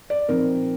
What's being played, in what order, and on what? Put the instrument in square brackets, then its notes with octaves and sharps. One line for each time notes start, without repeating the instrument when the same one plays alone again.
[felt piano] D5
[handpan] A#2 F3 C4 D#4 [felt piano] A#4